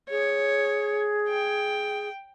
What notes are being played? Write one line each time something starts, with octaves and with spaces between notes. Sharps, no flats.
G#4 C#5
G5